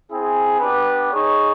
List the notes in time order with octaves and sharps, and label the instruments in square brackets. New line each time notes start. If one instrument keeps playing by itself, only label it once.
[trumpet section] C4 E4 G#4
B3 D4 G4 B4
D#4 G#4 C#5